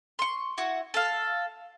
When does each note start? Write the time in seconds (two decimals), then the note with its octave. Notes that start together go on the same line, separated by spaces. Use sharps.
0.19 C6 C#6
0.58 E4 F#4
0.94 A4 F5